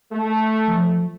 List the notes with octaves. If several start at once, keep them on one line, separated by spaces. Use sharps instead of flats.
A3
F3